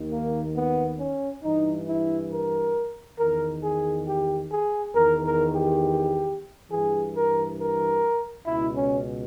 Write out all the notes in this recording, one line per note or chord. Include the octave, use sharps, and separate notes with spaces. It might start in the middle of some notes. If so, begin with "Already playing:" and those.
Already playing: D#2 D#3
A#3
B3
C#4
G2 E3 D#4
E4
A#4
E2 D#3 A#4
G#4
G4
G#4
E2 D#3 A#4
A#4
G4
G2 E3 G#4
A#4
A#4
C#2 B2 E4
C#4